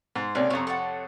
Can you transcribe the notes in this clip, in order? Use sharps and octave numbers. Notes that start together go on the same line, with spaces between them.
G#2 C5
C#2 C3 A#3 D4 C#5
F2 C3 C#5 A#5
A4 C#5 F#5